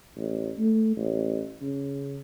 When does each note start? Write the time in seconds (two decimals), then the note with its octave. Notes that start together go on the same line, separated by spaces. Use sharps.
0.16 A1
0.59 A3
0.96 A1
1.61 C#3